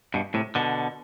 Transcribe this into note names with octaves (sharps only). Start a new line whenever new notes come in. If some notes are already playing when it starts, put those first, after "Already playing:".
G2 B2
A2 C3
B2 D3